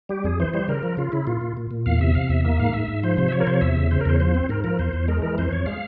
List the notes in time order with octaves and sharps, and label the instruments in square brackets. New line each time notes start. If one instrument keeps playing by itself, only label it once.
[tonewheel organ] G3 G4
F2 G#4
E3 C5
G3 C5
C#3 A#4
F3
C#3 F4
C#3 E4
A#2 F4
A#2
A#2
A#2
E2 F5
C3 E5
C3 F5
E2 E5
A#3 E5
G#2 F5
G#2 E5
G#2
F3 C5
C3 C5
E5
F3 C#5
A#4
C3 C5
C#5
E2 E5
C#3
C#3 C5
A#4
E2 C5
F3 C5
C4
G#2 A#4
F3 A#4
E2 C5
E2
G#3 A#4
E3 A#4
F2 C5
F2 C#5
G#3 F5